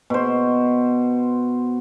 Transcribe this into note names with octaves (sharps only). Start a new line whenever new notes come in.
B2 C5